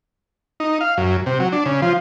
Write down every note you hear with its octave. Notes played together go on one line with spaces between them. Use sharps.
D#4
F5
F#2
C3
F#3
D4
C#3
F3